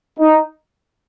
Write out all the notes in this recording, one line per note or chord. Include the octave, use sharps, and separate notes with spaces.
D#4